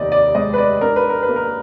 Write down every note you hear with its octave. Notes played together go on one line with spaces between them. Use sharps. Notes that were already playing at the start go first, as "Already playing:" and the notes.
Already playing: F1 D#2 D#3 D5 D#5
D5
G#3 D#5
B4
D5
D4 A#4
B4
A#4
B4
A#3
A#4